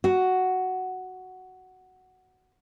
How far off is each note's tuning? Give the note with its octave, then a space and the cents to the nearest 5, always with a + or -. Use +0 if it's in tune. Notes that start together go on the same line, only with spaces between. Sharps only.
F#4 +5